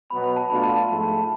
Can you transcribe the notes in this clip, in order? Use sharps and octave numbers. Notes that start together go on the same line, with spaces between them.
B2 F#3 B3 F#4 B5
B5
A5
B2 A3 D4 F4 B5
A5
A5
G#2 F3 A3 A5
A5